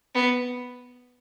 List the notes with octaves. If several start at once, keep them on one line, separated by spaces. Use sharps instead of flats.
B3